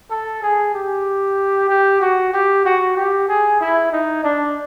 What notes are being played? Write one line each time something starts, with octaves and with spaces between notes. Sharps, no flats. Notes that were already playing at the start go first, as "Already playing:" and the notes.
A4
G#4
G4
G4
F#4
G4
F#4
G4
G#4
E4
D#4
D4